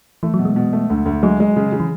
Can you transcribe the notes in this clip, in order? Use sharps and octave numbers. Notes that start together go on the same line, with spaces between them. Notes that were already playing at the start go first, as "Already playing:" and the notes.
E3 A3
F#3
B2
G#3
B2
A3
D2
D2
F#3 G#3
G#3
C#3
C#3
E3